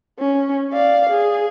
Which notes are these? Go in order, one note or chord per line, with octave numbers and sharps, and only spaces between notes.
C#4
D5 F5
G#4